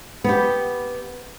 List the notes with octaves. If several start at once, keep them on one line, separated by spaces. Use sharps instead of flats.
B3 G4